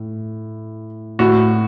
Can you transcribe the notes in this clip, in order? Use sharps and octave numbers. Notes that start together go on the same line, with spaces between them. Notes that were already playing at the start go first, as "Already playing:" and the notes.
Already playing: A2
A2 F#4